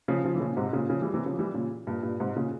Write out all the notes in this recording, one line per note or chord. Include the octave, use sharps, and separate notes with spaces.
C#3 F3
C#3 F3
E3
A#2 C#3
G#2 C3
A#2 C#3
C#3 F3
E3 G3
C3 E3
C#3 F3
E3 G3
A#2 C#3
G2 A#2
G2 A#2
G#2 C3
A#2 C#3